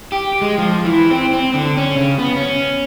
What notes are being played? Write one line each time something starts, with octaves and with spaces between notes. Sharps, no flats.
G4
G#3
F3
E3
C4
C4
D3
C#4
C#3
B3
C#4